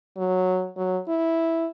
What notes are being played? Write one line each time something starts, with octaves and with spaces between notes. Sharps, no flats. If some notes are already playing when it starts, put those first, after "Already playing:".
F#3
F#3
E4